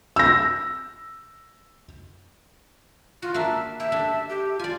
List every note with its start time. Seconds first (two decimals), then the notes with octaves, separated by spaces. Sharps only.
0.16 E6 A#6
3.22 F4 F#4
3.34 A#3 D4 E5
3.80 G4 E5
3.92 D4 A4
4.29 G4
4.59 F4 D5 G#5